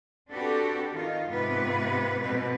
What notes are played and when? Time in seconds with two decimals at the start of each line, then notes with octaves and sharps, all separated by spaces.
0.31 C4 D4 F#4 G4 A4 B4
0.92 D#3 D#4 F4
1.30 G#2 C3 B3 F4 B4
2.21 B2 C4 B4